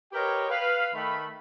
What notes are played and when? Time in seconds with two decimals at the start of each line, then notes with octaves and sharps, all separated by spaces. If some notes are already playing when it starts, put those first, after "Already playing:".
0.12 G4 A#4 B4 C#5 D#5 G5
0.50 B4 F5
0.94 D#3 A3 B5